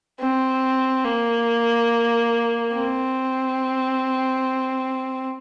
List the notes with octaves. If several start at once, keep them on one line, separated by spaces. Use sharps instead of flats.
C4
A#3
C4